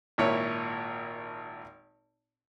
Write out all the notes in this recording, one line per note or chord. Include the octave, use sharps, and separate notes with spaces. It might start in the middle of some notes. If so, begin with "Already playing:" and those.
G#1 A#2 E4 A#4 C#5